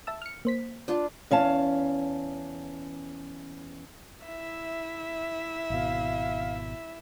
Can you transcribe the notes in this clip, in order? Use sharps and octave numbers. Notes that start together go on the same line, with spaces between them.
E5 A5 E6
F6 C#7
A#3 C5 B6
D4 F4
E2 C#4 F5 A5
E4 E5
G#1 B2 F5